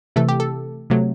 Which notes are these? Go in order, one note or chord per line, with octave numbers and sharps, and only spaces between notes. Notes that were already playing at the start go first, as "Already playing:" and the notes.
C3 E3 A3 A4
G4
A4
C3 F#3 A3